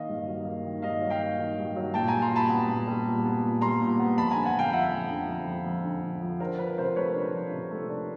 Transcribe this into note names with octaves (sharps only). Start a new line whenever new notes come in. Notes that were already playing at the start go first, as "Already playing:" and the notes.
Already playing: D#3 A#3 D#5 F5
G2
F#3
A#3
D#3
G2 D#5 F5
F#3
F5 G5
A#3
D#3
G2
F#3
A#2 G5 A5
G3 G#5 A#5
A#5 C6
A#2 A5 B5
B3
A#2
G3
A#2
B3
A#2
G3 A#5 C6
A#2
B3
F2 A5 B5
D3 G#5 A#5
F#5 G#5
F2 F5 G5
F3 E5 F#5
F2
D3
F2
F3
F2
D3
F2
F3
D4 A#4 C5
F3 B4
C3 A#4 C5
A3 B4 C#5
D4
F3
C3
A3
D4